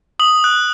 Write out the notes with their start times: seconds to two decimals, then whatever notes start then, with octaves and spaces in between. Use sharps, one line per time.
0.19 D#6 F#7
0.44 F#6